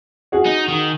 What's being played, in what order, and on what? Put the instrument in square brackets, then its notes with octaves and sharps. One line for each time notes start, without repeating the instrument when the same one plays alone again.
[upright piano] C#4 F#4 G#4
[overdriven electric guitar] D#4
D#3